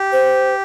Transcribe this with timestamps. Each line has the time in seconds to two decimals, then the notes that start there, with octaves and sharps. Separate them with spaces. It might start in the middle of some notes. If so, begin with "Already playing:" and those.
Already playing: G4
0.12 C5